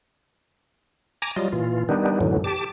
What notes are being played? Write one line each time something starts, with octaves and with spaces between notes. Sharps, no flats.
G#5 A#5 D6 A#6
F#3 G3 F4 D#5
A#2 E3 F4
D#3 G3 B3 D4 D#4
F#2 A2 D3 E3 F#3
G4 A5 D6